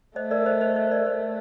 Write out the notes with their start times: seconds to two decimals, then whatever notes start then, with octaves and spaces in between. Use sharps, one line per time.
0.16 A3 C5 D#5
0.31 A#4 D5
0.46 C5 D#5
0.61 C5 D#5
0.76 C5 D#5
0.87 C5
0.91 A#4 D5
1.06 A3 C5